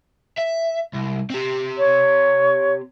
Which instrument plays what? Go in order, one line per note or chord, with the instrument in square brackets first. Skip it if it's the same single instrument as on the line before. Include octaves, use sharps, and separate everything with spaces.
[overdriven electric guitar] E5
C2
C4 G4
[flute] C#5